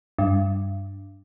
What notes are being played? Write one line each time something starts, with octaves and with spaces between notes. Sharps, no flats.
G2